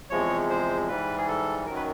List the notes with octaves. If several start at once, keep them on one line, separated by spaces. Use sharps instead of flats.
E2 C3 F3 G#3 C#5
C5
G#2 E3 G3 B4
G#4
A4
F#2 D#3 F#3 A#4
B4